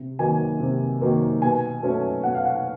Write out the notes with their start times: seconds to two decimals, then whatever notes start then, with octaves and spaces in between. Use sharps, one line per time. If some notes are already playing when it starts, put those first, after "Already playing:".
Already playing: C3
0.19 D#3 F#3 A#3 G#5
0.60 C3
1.01 D#3 F#3 A#3
1.42 B2 G#5
1.82 F#3 A3 C#4
2.23 B2 F#5
2.35 F5
2.45 F#5